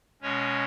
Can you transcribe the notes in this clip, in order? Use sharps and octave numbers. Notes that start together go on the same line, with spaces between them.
B2 G#3 C#4 C#5